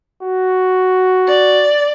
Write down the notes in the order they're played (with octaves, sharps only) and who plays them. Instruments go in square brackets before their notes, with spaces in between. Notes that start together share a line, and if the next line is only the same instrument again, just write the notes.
[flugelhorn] F#4
[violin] D5